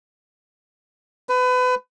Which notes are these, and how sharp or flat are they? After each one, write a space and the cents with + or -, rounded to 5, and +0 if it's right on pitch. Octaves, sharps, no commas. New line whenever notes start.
B4 +30